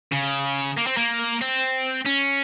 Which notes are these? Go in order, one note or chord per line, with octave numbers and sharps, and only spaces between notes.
C#3
A#3
C4
A#3
C4
C#4